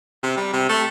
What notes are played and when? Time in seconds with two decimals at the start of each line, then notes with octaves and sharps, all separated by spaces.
0.23 C3
0.37 G3
0.53 C3
0.69 A3